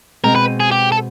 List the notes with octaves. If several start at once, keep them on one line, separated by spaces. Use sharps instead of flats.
B2 G#3 C4 A#4
B4
G#4
G4
A4